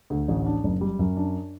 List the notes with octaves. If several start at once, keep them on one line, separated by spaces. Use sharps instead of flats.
D2
A1
D4
F#1
G3
F#2
D4